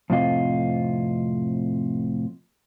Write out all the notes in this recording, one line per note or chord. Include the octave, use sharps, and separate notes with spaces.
F2 A2 C3 F4 D#5